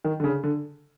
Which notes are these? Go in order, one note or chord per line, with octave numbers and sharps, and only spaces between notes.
D#3
D3
C#3
D3